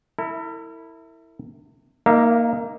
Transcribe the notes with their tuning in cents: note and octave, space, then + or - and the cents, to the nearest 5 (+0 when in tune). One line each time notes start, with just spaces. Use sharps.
E4 -5 A#4 -45
A#3 +0 D#4 +0 E5 +45